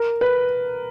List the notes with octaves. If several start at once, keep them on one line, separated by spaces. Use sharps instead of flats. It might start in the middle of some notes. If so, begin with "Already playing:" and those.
Already playing: A#4
B4